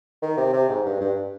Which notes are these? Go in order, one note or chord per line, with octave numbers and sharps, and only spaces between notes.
D#3
C3
C3
G#2
G2
G2